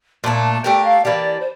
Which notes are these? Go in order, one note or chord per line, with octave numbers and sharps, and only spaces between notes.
A#2 A3 D4 A5
A3 D4 G4 A#4 G5
F5
E3 A#3 D4 G4 D5
C5